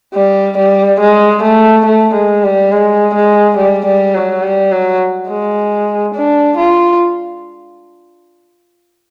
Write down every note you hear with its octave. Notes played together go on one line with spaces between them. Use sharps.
G3
G3
G#3
A3
A3
G#3
G3
G#3
G#3
G3
G3
F#3
G3
F#3
G#3
D4
F4